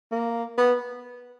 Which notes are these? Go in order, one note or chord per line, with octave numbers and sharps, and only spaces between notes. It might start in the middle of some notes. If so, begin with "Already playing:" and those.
A#3
B3